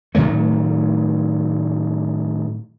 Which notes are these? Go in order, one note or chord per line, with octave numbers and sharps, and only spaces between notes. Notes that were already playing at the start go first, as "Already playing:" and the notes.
A2 D#3 F#3 A3